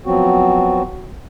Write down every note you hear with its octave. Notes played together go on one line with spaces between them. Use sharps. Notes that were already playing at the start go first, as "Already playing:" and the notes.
F3 F#3 B3 C4 F#4